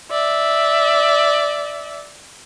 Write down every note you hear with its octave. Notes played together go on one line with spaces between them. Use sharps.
D5 E5